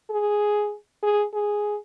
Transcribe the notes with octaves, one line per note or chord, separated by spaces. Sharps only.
G#4
G#4
G#4